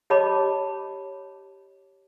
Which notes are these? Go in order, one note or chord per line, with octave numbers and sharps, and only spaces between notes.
G4 C#5 D#5 A5 B5 D6